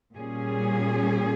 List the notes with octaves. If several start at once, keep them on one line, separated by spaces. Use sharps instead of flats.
A#2 G3 C#4 G#4